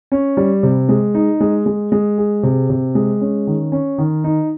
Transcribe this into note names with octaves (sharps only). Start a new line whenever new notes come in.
C#4
G3
C3
G#3
D#4
G#3
G#3
G#3
G#4
C3
C3
G#3
C#4
D#3
C#4
D#3
D#4